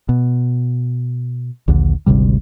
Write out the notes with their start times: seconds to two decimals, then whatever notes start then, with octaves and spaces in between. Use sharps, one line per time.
0.09 B2
1.68 A#1 D#2 D3
2.06 G#1 D2 C3 G3